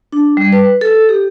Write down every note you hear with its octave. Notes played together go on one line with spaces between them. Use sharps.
D4
G3
B4
A4
G4